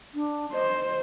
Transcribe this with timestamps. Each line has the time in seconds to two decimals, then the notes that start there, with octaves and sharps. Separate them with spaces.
0.14 D4
0.53 C5 D#5